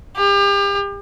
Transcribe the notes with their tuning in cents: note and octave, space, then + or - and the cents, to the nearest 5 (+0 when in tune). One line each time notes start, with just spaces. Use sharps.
G4 +35